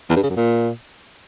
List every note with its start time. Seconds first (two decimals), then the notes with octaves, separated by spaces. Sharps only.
0.09 E2
0.16 G2
0.23 C#3
0.30 F#2
0.36 A#2